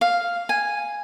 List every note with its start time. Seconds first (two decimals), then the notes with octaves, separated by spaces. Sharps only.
0.01 F5
0.49 G#5